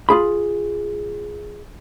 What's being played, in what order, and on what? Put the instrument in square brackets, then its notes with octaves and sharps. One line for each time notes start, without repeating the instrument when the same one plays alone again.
[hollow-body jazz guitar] F4 G#4 B5